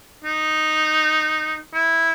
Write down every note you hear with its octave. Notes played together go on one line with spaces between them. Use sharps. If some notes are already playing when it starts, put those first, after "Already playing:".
D#4
E4